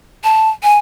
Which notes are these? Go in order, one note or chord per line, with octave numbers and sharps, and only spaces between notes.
A5
G#5